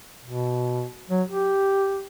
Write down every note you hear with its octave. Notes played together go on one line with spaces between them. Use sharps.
B2
F#3
G4